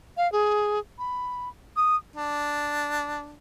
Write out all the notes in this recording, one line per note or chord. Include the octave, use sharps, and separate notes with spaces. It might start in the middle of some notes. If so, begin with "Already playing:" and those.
F5
G#4
B5
D#6
D4